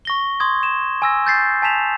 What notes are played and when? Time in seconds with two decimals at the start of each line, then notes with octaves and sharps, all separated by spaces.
0.05 C#6 A#6 G7
0.40 C6 D#6 G#6
0.63 E7
1.02 G#5 E6 A#6
1.26 G6 A6 C7
1.62 G#5 A5 B6 E7 F7